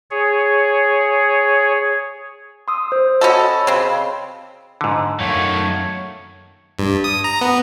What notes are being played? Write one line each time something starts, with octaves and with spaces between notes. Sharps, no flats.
G#4 C#5
C6 D#6 E6
C5
C#4 F#4 A4 D#5 B5
C#3 C4
G#2 D3
F#2 D#3 A3 C#5 F5 F#5
G2
D#6
A#5
B3